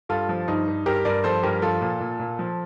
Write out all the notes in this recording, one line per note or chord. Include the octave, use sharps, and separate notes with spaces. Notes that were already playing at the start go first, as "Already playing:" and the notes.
G2 F4 A4
F3
G2 D#4
G2
G2 G4 A#4
G2 A#4 D5
F3 A4 C5
G2 G4 A#4
F3 F4 A4
A#2
A#2
A#2
F3